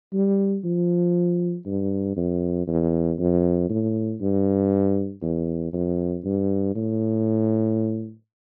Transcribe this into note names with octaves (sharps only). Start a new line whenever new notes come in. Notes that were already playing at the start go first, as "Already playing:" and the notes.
G3
F3
G2
F2
E2
F2
A2
G2
E2
F2
G2
A2